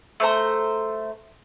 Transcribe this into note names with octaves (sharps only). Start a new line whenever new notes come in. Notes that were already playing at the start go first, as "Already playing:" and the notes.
A3 C5 A#5